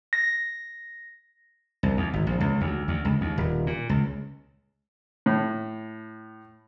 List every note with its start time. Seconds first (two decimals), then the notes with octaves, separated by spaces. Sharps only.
0.13 A#6
1.83 C2
1.97 D#2
2.14 G#1
2.27 A#1
2.41 C#2
2.61 D2
2.88 D2
3.05 C#2
3.21 D#2
3.38 D#1
3.67 A#2
3.89 C#2
5.26 A2